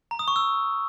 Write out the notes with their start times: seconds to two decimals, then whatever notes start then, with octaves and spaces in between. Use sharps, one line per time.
0.11 A#5
0.19 D#6
0.28 C#6
0.36 E6